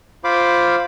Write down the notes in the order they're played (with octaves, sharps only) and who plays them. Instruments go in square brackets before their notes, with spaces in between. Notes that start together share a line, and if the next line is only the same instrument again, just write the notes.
[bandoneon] F4 C5 F5 B5 D6